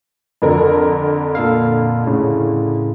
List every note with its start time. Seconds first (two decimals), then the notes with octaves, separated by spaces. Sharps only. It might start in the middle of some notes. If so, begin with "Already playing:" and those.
0.42 F2 D3 A#4
1.35 A#2 A4 F5
2.07 A2 C#3